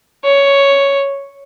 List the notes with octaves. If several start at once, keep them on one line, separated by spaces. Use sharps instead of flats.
C#5